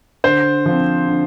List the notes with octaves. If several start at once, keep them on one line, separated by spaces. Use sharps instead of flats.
D3 C5
F3 C4
D3